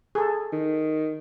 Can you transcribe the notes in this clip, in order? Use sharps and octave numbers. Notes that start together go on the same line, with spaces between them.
G#4 A4
D#3